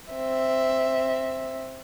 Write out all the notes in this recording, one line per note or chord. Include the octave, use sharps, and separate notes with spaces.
C4 E5